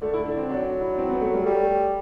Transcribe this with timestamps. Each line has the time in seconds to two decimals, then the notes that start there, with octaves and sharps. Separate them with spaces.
0.02 D3 A3
0.14 E4
0.26 D4
0.37 C4
0.49 F#3 D4
0.81 E4
0.89 D4
0.98 C4
1.10 B3
1.21 A3
1.34 G3
1.45 G3 A3